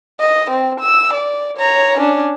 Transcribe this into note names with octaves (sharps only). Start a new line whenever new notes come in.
D#5
C4
E6
D5
C#5 A#5
C#4 D4